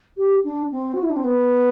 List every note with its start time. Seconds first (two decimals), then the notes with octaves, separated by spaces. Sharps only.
0.17 G4
0.44 D4
0.71 C4
0.94 F#4
1.02 E4
1.10 D4
1.16 C4
1.24 B3